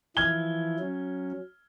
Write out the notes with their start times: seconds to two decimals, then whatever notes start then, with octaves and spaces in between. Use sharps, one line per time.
0.17 E3 F3 E4 F6 G#6 G7
0.79 F#3 C#4